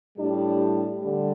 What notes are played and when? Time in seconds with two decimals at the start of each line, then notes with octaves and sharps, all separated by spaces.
0.18 A2 G3 D4 G4
1.02 D3 G3